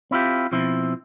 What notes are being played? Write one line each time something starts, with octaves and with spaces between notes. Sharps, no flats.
C4 E4 F4 G4
B2 F3 C4 E4